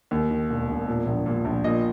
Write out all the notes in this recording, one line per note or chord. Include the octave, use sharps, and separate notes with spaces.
D#2
D#3
E1
E1
A#2
A#1
A#2
A#1
A#2 D#5